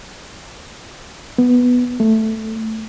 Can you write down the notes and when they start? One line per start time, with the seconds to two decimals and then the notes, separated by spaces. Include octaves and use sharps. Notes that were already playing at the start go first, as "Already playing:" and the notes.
1.38 B3
2.00 A3